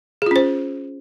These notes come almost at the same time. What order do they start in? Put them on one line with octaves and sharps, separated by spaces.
G#4 F4 C#4 C5